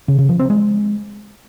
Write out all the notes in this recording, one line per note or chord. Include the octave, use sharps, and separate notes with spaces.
C#3
C#3
F3
C4
G#3